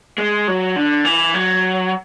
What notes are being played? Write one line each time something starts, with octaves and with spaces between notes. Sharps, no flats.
G#3
F#3
D3
E3
F#3